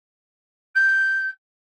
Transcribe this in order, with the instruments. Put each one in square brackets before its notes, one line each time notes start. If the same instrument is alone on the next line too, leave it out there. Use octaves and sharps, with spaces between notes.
[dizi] G6